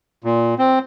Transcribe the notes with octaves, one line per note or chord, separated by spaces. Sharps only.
A#2
C4